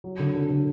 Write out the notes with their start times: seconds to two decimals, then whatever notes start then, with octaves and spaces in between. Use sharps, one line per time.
0.04 F#3
0.19 D3
0.35 D3
0.50 D3